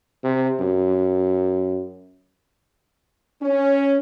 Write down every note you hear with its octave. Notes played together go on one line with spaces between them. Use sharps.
C3
F#2
C#4